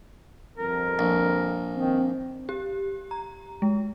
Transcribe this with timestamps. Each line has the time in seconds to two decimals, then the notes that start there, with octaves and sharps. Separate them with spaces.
0.58 G1 F2 A#4
0.99 A#1
1.76 D#3 C4
2.49 G4
3.11 A#5
3.62 G#3